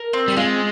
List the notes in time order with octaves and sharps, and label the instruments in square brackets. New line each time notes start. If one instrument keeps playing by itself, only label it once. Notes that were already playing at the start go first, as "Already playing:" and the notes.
Already playing: [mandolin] A#4
C4
[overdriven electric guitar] G3
[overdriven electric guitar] G#3 [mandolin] F4